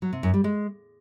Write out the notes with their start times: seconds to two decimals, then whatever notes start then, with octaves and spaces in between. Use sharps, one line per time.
0.02 F#3
0.13 C3
0.23 F#2
0.34 G3
0.44 G#3